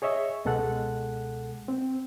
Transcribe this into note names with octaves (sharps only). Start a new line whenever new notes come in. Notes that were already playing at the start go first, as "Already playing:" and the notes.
G#4 C#5 D#5 E5 C#6
C#2 B2 G#3 A4 F#5 F#6
C4